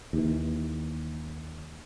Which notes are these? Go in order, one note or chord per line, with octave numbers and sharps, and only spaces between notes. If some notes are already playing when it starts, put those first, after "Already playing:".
D#2 E3